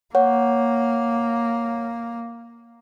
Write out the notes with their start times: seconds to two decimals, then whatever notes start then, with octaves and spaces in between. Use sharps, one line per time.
0.15 A#3 C#5 F#5